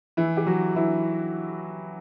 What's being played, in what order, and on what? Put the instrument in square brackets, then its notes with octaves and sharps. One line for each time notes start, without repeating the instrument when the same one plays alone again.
[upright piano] E3 E4
G4
F#3 F#4
E3 E4